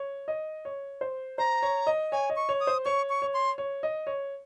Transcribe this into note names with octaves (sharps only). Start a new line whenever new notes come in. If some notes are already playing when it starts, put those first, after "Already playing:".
Already playing: C#5
D#5
C#5
C5
C5 A#5
C#5
D#5
C#5 G#5
D#5
C#6
C#5
D#6
C5
C#5 C#6
C#6
C#5
C6
C#5
D#5
C#5